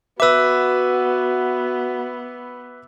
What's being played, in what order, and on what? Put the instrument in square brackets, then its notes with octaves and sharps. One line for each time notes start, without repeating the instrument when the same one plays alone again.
[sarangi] B3 [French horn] F#4 [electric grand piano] B4 E5 [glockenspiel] D6 E6